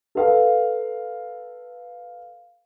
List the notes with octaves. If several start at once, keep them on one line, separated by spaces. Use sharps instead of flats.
A4 B4 F5